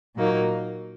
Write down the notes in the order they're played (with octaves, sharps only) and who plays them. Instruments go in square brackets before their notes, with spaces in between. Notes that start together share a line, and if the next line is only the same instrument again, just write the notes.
[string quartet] A#2 F#3 A#3 D#4